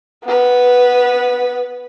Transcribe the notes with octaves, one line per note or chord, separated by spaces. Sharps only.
B3 B4